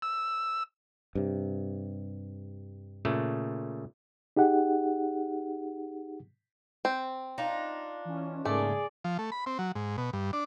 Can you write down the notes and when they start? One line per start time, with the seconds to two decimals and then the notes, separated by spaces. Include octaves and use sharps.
0.02 E6
1.15 G2 C3
3.05 A#2 C#3 A3
4.37 D#4 G4 G#4 F#5
6.85 C4
7.38 D4 D#4 F4
8.05 E3 C#4
8.45 G#2 C#3 A3 A#3 G#4 D5
9.04 F3
9.19 A3
9.32 B5
9.46 C4
9.59 F#3
9.75 G#2
9.98 B2
10.13 G2
10.33 D4